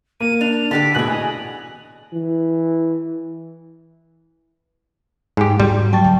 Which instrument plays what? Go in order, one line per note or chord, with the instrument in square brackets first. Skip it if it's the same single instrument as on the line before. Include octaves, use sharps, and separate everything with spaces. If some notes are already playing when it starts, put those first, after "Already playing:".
[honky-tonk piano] A#3 [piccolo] D#7
[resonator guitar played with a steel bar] D4 [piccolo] F7
[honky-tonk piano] D3 [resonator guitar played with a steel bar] D4 G4 A4 [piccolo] B6
[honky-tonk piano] A1 B2 F#6 [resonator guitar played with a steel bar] E3 G#4 [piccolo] F#7
[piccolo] D#5 [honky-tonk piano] G#5
[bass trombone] E3
[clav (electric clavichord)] G#2 G4
[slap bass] G#2 [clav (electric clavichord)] G3 [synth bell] F#4 C6
[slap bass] F3 [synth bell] F#3 C#6 A6 [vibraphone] G5 A5
[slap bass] C#2